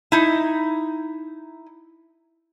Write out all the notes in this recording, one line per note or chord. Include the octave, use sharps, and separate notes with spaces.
D#4 E4